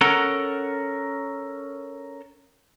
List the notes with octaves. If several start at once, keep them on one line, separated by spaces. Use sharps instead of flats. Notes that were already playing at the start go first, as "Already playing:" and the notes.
C#4 A4 A#4 F#5 A#5